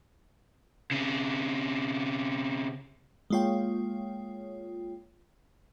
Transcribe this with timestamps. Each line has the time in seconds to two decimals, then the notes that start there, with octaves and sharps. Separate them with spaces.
0.91 C#3 C4
3.30 G#3 A#3 F4 C#5 G5